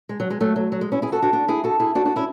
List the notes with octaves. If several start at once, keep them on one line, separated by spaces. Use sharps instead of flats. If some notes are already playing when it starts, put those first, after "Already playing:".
G#3
F#3
G#3
F#3 A3
F#3
F#3
G#3
C#4 E4
E4 G#4
F#4 A4
D4 F#4
D4 F#4
E4 G#4
F#4 A4
E4 G#4
D4 F#4
D4 F#4
C#4 E4